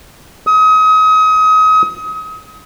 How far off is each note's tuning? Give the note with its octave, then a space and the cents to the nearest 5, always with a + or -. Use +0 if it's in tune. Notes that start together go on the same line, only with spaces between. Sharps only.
D#6 +30